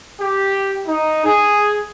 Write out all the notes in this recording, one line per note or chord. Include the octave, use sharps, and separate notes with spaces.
G4
D#4
G#4